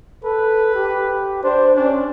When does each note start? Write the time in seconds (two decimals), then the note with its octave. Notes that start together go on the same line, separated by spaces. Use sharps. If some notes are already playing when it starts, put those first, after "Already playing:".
0.24 A4 B4
0.75 G4
1.44 D4 C5
1.77 C#4 D4